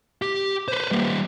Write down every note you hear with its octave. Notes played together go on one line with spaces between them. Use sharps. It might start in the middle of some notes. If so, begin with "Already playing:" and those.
G4
B4 C5
G3 A#3